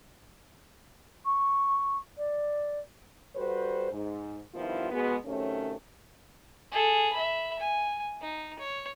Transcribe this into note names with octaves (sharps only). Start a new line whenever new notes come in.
C#6
D5
G3 F#4 A4 B4 C5
G#2
G2 D#3 F3 B3 E4 F4
B2 G#3 B3
C3 D#3 F#3 A3 C#4
G#4 A4
E5 B5
G#5
D#4
C#5